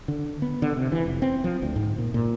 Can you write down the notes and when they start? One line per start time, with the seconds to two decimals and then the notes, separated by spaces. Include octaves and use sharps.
0.08 D3
0.42 B3
0.62 D3
0.77 C3
0.92 E3
1.06 F1
1.22 C4
1.44 F3
1.62 D2
1.76 G#2
1.98 A#2
2.14 A#2